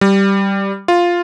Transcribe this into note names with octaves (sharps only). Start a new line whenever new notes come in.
G3
F4